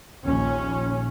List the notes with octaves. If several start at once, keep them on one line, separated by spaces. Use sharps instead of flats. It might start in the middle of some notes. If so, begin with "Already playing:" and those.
A#1 D#2 C#4